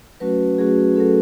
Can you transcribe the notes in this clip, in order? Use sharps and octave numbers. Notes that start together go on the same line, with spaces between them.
F#3 A3 C#4 F#4 B4
F#3 A3 C#4 F#4 G#4
F#3 A3 C#4 F#4 A4